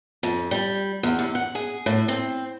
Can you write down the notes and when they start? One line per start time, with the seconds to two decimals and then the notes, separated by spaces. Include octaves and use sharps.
0.23 F2
0.51 G3
1.03 E2
1.19 C3
1.35 F#5
1.55 G#4
1.86 A2
2.08 C4